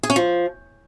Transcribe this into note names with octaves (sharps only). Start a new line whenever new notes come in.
G#4
C#4
F3